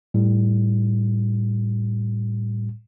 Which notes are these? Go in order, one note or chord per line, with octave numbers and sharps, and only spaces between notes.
A2 G3